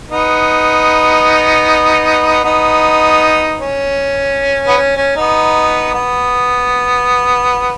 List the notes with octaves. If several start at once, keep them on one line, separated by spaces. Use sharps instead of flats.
B3 D#4
B3 D#4
C#4
B3
C#4
C#4
B3 D#4
B3